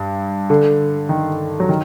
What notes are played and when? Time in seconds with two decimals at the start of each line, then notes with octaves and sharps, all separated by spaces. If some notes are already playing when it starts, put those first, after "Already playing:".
Already playing: G2
0.50 D3
1.09 D#3
1.60 F#3
1.69 D#3